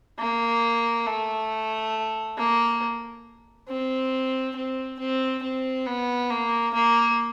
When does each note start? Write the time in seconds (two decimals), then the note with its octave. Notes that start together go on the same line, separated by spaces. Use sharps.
0.19 A#3
1.06 A3
2.37 A#3
3.68 C4
4.56 C4
4.99 C4
5.43 C4
5.86 B3
6.30 A#3
6.74 A#3